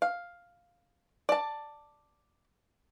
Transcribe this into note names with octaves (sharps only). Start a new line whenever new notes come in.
F5
D5 A5